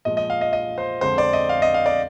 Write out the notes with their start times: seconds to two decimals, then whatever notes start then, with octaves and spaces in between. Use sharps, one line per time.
0.05 A#2 F3 G#3 D#5
0.17 D#5
0.30 F5
0.41 D#5
0.53 D#5
0.78 C5
1.01 F2 D3 G#3 C5
1.18 D5
1.33 D#5
1.49 F5
1.62 D#5
1.74 F5
1.86 D5